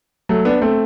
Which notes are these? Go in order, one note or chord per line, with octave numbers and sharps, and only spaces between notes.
F#3 A3
B3 D4
A3 C4